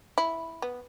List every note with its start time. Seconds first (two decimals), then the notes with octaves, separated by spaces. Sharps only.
0.18 E4
0.62 B3